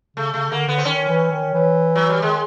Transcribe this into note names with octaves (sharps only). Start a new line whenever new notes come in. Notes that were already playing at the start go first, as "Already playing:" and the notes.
C#3 A3
C#3 A3
D3 A#3
D3 B3
C4
D#3 C#4
E3
D#3
E3
F#3
G3
D#3 G#3